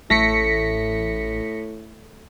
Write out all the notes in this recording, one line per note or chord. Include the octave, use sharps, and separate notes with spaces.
A1 A2 A3 A#6 B6 C#7